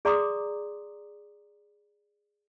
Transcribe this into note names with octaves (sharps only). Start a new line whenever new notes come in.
G#4 D5 A#5 C6 D6 D#6